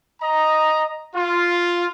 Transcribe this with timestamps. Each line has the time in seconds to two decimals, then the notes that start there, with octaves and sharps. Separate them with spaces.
0.22 D#5 A#5
1.15 F4